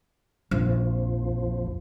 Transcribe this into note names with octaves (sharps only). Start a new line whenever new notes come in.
A#1 F2 F3